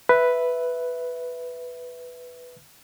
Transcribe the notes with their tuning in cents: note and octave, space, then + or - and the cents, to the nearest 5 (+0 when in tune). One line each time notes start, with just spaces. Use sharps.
B4 +0 E5 +0